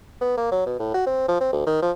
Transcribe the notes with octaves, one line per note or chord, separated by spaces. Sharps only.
B3
A#3
F#3
B2
A2
F#4
C4
F3
C4
D2
D#3
F3